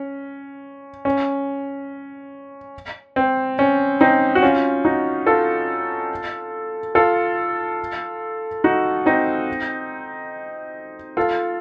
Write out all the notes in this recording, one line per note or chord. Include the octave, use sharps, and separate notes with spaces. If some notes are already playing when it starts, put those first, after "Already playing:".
Already playing: C#4
C#4
C4
C#4
C4 D#4
F#4
C#4 F4
D#4 F#4
F4 A4
F4 A4
D#4 F#4
C4 D#4
F4 A4